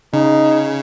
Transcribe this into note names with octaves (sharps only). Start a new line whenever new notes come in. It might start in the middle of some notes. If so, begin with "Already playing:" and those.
C#3 D#4